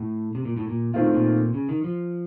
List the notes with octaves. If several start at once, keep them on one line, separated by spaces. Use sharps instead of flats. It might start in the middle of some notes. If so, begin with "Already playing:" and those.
Already playing: A2
C3
A#2
A2
A#2
A#2 D#3 A3 C4 F4
A2
A#2
C#3
D#3
F3